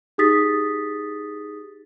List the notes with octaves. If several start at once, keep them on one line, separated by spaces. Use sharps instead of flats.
D#4 G4 G#4 D#6 A6 B6